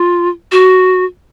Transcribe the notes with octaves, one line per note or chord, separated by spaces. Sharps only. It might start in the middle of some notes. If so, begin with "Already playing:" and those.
Already playing: F4
F#4